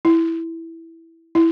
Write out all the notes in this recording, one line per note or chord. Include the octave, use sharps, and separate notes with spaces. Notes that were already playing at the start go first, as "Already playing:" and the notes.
E4
E4